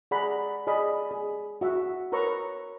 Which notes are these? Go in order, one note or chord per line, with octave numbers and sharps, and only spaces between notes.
G#4 D5 F#5 A#5 B5
G#4 D5 D#5 B5
G#4
F#4 E5 F#5
A#4 B4 C#5 A#5 C#6 E6